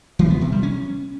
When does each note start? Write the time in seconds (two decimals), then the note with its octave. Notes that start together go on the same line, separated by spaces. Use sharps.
0.19 E3
0.30 B3
0.41 C3
0.52 G3
0.63 C#4